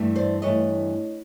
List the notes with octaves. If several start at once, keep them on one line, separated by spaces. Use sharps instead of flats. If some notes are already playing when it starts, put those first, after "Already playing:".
Already playing: G2 E3 A3
C5 D5
G2 E3 A3 C#5 D#5